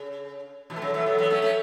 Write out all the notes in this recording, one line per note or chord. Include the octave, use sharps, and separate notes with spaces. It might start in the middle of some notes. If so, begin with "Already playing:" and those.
Already playing: C#3
B2 E3
A3
C#3 F#3
E3 A3
F#3 B3
F#3 B3
A3 C#4
A3 C#4